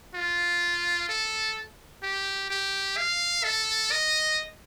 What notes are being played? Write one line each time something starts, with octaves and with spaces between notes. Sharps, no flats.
F4
A4
G4
G4
F5
A4
D#5